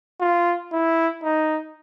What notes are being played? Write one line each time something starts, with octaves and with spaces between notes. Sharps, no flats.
F4
E4
D#4